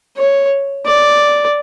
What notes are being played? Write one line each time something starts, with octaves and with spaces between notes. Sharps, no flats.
C#5
D5